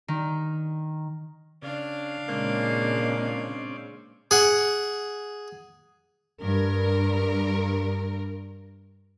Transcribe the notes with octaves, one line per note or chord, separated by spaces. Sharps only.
D#3
C#3 D4 F5
A#2 C#3 G#3 A#3 C4 C#4 D5
G#4 F#5
G2 A#4